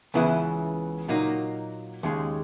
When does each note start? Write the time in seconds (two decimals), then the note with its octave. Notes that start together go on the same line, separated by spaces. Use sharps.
0.14 C#2 C#3 E3 B3 E4
1.08 A#2 F#3 A#3 D#4
2.03 D#2 C#3 G#3